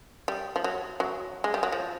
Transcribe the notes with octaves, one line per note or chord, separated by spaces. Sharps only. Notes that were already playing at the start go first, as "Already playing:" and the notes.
G3
F3
F#3
F#3
G#3
G3
F#3
F3